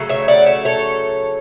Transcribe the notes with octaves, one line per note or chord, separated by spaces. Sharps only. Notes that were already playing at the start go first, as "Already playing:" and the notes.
Already playing: C#3 F#3 A3
C#5 E5
D5 F#5
C#5 E5
A4 C#5